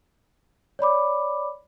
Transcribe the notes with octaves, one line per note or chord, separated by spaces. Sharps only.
C#5 D5 B5 D6